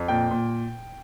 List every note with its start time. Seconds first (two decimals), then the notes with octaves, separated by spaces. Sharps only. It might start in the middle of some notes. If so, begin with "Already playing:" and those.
Already playing: F2
0.08 A#2 G5
0.31 A#2